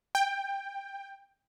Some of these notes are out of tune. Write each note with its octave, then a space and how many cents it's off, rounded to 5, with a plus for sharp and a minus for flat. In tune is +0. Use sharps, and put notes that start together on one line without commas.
G5 +15